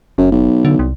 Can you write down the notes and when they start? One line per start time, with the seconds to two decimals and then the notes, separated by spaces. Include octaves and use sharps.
0.18 F#1 F#2
0.32 B1
0.65 D3
0.79 C2